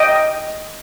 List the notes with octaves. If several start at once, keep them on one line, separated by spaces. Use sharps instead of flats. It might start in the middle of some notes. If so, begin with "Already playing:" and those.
Already playing: D#5 G5